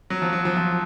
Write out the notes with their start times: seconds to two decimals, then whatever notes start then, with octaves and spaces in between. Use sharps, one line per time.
0.10 F#3
0.22 F3
0.33 F#3
0.45 F3
0.57 F3